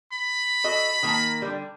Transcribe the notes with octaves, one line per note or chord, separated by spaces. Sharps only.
B5
F#4 A4 D#5
D#3 A#3 A5
D3 G3